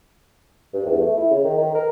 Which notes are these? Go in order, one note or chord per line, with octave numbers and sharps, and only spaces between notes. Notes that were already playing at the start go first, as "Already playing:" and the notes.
G2
E2
A3
E4
C#3
D#3
D#3
A#4